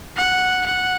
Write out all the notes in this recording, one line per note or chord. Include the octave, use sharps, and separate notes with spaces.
F#5
F#5